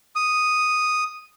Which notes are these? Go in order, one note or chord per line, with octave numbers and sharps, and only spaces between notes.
D#6